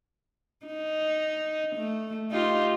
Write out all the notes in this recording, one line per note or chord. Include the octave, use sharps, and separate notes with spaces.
D#4
A3
D#4 F4 G4